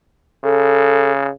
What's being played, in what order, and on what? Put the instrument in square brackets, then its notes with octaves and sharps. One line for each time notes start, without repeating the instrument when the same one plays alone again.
[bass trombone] C#3 [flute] A4